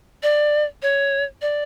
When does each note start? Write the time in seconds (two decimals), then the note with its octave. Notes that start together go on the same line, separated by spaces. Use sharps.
0.23 D5
0.82 C#5
1.42 D5